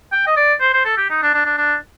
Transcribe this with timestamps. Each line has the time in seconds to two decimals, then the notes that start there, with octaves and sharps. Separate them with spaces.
0.12 G5
0.27 D#5
0.37 D5
0.61 C5
0.74 C5
0.85 A4
0.97 G4
1.10 D#4
1.22 D4
1.34 D4
1.46 D4
1.58 D4